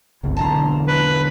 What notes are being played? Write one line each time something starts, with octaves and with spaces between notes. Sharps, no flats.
G1 C#2 C3
B1 E2 D3 A5 A#5 C6
B4